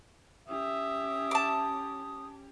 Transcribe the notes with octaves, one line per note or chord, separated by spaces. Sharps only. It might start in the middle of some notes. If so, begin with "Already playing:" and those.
C#4 G4 E5 D#6
A5 D6